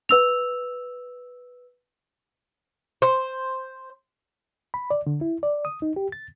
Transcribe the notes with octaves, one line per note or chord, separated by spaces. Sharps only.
B4 E6 F7
C5
B5
D5
D3
E4
D5
D#6
D#4
G4
A6